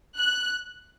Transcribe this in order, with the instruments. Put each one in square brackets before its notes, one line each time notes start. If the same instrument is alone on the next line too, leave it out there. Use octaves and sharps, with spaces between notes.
[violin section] F#6